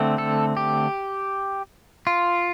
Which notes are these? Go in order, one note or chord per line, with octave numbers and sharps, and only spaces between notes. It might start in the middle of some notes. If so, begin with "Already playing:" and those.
Already playing: D3 A3 C4
A4
G4
F4